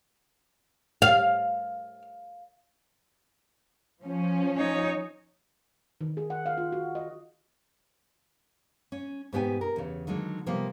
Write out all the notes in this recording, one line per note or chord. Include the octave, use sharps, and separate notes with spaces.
F5
F3 C#4
D#4 C#5
D#3
G#4
F#5
F5
F4
F#4
D#5
C#4
G#2 B2 B3 G4 G5 G#5
A#4
E2 C#3
D3 D#3 F#3 G#3 A#3
C3 F3 G3 A#3 B3